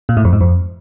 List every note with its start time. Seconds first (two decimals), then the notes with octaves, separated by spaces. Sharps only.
0.09 A#2
0.17 A2
0.25 F2
0.33 G#2
0.41 F2